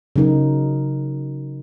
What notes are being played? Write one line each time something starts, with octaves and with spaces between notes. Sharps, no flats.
C#3 F#3 D#4 A#4